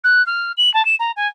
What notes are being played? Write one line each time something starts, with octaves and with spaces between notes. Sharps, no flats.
F#6
F6
F#7
A5
E7
A#5
G#5